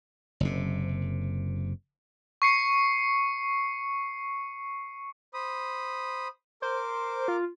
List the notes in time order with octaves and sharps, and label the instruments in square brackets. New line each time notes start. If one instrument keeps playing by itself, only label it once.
[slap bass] F#1 C3
[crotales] C#6 C7 C#7
[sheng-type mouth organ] C5 B5 D#6
[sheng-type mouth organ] A#4 D6 [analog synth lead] C5
[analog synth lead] F4